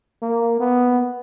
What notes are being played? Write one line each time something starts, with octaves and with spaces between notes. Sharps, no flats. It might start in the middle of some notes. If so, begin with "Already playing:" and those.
A#3
B3